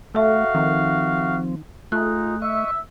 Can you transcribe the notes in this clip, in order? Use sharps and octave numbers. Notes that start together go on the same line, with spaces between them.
A3 F#4 A4 E5 F5
D#3 F3 C4
G#3 A3 D#4 F4 F#6
D#5 E5 C#6